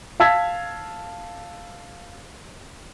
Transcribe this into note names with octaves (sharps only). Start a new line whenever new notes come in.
F5 A5 E6 G#6 B6